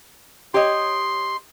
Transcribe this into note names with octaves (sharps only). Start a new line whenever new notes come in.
G4 C#5 D#5 C6